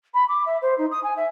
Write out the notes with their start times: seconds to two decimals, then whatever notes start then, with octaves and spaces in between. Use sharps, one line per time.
0.14 B5
0.28 D6
0.46 E5
0.62 C5
0.78 D#4
0.91 D#6
1.03 G#5
1.17 E5